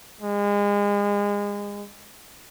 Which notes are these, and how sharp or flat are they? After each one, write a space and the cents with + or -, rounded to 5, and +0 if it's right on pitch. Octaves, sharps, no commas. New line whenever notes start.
G#3 -30